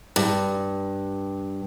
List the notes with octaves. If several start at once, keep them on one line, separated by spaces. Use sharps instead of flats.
G2